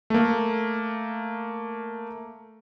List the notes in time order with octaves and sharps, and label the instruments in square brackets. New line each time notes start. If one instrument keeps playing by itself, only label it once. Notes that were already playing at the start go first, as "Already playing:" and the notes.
[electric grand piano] A3 A#3